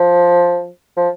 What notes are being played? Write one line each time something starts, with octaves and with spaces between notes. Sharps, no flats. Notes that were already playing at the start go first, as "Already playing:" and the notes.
Already playing: F3
F3